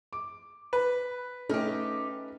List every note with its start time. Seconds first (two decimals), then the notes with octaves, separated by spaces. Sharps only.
0.13 D6
0.73 B4
1.49 A3 C#4 D#4 G4 F6